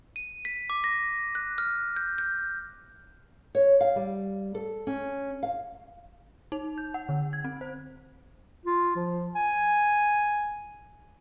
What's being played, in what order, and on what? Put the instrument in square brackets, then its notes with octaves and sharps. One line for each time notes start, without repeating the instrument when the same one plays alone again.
[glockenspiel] D#7
B6
D6
A#6
F#6
F6
G6
G6
[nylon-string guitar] C#5
F5
G3
A4
C#4
F5
[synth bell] D#4
G6
F#5
D3
G#6
C4
C5
[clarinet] F4
F3
G#5